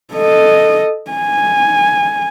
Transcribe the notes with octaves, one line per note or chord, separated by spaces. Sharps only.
A4 D#5
G#5